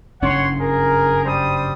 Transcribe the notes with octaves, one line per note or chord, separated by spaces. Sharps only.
F#1 G2 C#4 C#5 F#5 C6
G#4 A#4
G3 C5 D#6